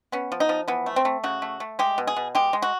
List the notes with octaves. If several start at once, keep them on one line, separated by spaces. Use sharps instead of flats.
B3 C#4
F3
D#4
F3
E3 B3
A3
C4
A3
C#3 F#4
A3
A3
G#3 G4
B2
G#4
B2
G#3 G4
G#3
F#4